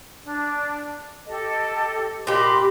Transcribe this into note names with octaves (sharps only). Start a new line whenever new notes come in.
D4
G4 A4 D#5
A#2 G4 D#5 B5 C6